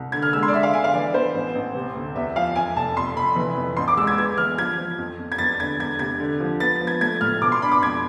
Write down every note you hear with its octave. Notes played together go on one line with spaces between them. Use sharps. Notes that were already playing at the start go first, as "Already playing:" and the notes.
Already playing: C2
D3 G#6
F6
G#3 E6
C6
D5
D3 E5
F5
D3 G#5
F5
E3 D5
B3 C5
A1
A1
C3
D2
E2 E5
F3 F5
F2 G#5
F1 A5
F2 C6
F1 B5
E3
F2
A1 C6
D6
G#3 E6
G#6
B3 G#6
E3 F6
F3 G#6
F3
F2
F2
G#6
E2 A6
D3 G#6
E2 G#6
C3 G#6
D3
F3
B3 A6
F3
G#6
A3 G#6
A2 F6
B2 D6
C6
D4 B5
D6
F2 G#6